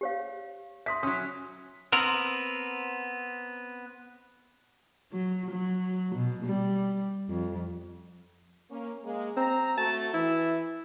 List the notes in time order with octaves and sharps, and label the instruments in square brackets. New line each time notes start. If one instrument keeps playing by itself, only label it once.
[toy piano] G4 C#5 F5
[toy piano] E5 C6 [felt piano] D#6 B6
[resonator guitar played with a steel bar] F#3 C#4 [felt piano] D#6
[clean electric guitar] B3 C4 A#4
[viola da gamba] F#3
F#3
B2
G3
F2
[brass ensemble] A#3 C#4
G#3 A#3
[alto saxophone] C4 [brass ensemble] A#5
[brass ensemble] A3 F#4 [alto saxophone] A5
[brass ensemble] E3 [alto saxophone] E4